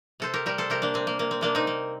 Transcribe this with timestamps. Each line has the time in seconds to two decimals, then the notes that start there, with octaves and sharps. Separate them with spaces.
0.20 C3 A4 C5
0.34 G4 A#4
0.46 G3 G4 A#4
0.58 A4 C5
0.70 C3 G4 A#4
0.82 A#3 D4
0.94 C3 C4
1.07 A#3
1.19 C3 A#3
1.31 C4
1.41 C3 A#3 D4
1.55 C4 D#4
1.67 A#3